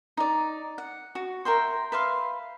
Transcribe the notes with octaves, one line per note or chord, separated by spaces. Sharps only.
D#4 D5
F#5
F#4
A#4 E5 G5 C6
B4 E5 F5 C6